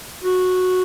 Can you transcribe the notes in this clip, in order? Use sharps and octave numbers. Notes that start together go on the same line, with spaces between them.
F#4